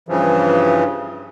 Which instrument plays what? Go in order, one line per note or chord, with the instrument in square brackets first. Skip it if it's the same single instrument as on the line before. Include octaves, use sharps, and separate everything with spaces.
[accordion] G2 C#3 E3 F3